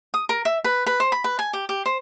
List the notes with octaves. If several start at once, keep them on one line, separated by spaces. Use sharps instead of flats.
D#6
A#4
E5
B4
B4
C5
B5
B4
G#5
G4
G4
C5